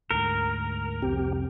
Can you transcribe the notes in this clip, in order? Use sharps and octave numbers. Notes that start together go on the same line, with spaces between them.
D2 G#2 A#4
C2 F2 C4 G4 G5